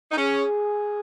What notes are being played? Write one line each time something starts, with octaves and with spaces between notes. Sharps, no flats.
D#4
C#4 G#4